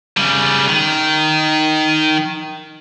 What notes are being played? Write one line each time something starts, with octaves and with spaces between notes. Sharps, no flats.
C#3 G3
D#3